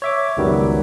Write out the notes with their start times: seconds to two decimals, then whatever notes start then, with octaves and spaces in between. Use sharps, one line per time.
0.02 C#5 E5 D6
0.37 C#2 F#2 D#3 F#3 G3 B3